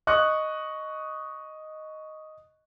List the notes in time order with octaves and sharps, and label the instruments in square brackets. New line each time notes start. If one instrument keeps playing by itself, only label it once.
[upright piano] D#5 C#6 F#6